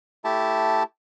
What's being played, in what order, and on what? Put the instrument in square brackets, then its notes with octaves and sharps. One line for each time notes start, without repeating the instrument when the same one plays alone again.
[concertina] A3 E4 G4 A5